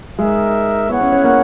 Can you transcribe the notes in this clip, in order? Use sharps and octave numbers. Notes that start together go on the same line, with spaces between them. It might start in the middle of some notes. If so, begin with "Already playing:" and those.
G#3 D#4 A#4 E5
B3 E4 G#4 C#5 F#5
C#4
C#4
A#3